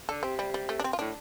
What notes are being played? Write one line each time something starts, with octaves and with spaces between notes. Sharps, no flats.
D3 A4
C3 C4
G3
G3
A3
D4
C4
F4
A2 D4